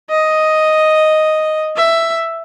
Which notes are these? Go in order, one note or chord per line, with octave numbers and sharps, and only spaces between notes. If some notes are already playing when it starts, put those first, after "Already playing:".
D#5
E5